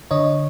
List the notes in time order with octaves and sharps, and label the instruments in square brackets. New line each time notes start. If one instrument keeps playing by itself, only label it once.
[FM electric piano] D3 C#5 D#5